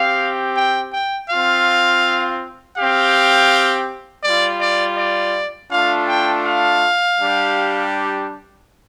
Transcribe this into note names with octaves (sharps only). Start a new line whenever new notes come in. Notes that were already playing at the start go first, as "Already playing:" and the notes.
Already playing: C4 G4 F5
G5
G5
C4 F4 F5
C4 G4 F5
G3 F4 D5
D5
D5
A3 D4 F4 F5
G5
F5
G3 D4 G4